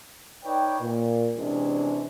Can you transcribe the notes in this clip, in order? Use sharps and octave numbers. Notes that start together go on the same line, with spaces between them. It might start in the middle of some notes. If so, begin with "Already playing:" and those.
D#4 B4 C#5 D5 G5
A#2
C3 E3 G#3 C#4 D4